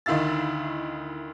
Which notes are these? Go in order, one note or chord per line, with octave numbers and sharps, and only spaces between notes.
D2 D#3 E4 F5 E6 A6